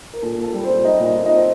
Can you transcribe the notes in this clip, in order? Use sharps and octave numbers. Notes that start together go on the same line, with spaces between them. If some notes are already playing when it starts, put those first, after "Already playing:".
A#4
A#2 A4
A#2 A4
G3
A#2 C4 C5
G3 D#4 D#5
A#2
D#4 D#5
A#2
D#4 D#5
C4